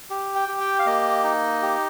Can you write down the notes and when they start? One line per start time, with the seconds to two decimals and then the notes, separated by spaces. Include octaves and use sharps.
0.10 G4
0.35 G5
0.48 G4
0.60 G5
0.79 F5
0.86 A#3 D#5
1.24 D#4
1.62 G4